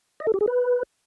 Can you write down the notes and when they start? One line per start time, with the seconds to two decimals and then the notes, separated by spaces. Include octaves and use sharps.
0.20 D#5
0.27 A4
0.34 G4
0.41 G#4
0.48 B4